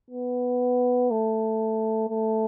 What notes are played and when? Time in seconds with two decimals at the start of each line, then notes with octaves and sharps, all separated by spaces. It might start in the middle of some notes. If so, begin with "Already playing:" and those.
0.11 B3
1.11 A3
2.08 A3